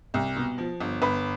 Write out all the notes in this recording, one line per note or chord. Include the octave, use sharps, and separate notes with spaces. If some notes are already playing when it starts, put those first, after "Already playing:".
C2
B2
F3
G1
G1 B4